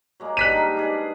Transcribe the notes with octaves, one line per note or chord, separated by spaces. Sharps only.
F#3 G#3 A#3
G#2 D3 G3 F#6 B6 D#7
D#4 A#4 F5
D4 G#4 B4